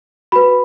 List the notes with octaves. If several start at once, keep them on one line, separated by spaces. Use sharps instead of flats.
F#4 B4 B5